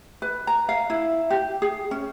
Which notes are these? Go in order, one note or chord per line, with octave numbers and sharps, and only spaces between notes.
B4
A#5
F5
E4
G4
G#4
C#4